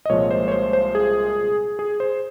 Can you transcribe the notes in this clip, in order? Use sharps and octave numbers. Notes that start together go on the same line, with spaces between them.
D#5
C2 A#2 F3 G#3 C#5
C5
C#5
C5
C5
G#4
G#4
C5